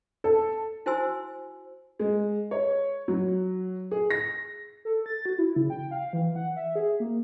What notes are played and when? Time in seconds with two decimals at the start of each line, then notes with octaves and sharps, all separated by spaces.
0.24 A4
0.86 E4 F#4 C5 G#5 C6 E6
1.99 G#3
2.51 C#5
3.08 F#3
3.91 G#4
4.10 A#6
4.85 A4
5.06 A6
5.26 F#4
5.38 E4
5.56 C#3
5.70 G5
5.91 F5
6.13 E3
6.36 F#5
6.56 E5
6.76 G#4
7.00 A#3